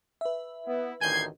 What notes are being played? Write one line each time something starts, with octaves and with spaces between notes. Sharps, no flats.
B4 E5
B3 E4
A1 D2 D#3 G#5 G6 G#6 C7